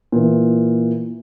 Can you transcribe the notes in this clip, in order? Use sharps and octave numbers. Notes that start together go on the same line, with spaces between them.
A#2 E3